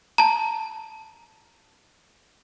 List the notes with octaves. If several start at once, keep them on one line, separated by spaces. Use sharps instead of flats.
A5 A#5